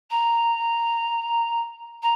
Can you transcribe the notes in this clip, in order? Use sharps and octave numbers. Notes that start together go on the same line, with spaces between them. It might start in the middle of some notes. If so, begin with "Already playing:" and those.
A#5
A#5